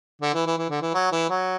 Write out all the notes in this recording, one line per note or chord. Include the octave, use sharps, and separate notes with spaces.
D3
E3
E3
E3
D3
E3
F#3
E3
F#3